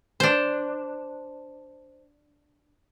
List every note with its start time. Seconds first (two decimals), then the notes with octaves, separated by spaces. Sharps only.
0.20 D4 C5